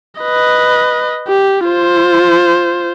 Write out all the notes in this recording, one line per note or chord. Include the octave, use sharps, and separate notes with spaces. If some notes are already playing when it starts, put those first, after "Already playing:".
B4 D#5
G4
F4 C5